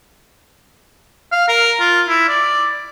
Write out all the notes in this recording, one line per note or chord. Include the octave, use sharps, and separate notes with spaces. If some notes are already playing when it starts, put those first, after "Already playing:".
F5
A#4
F4
E4
D5